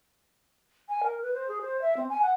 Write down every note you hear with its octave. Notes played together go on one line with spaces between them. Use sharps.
G#5
A#4
B4
C5
G#4
C5
E5
C4
G#5
F#5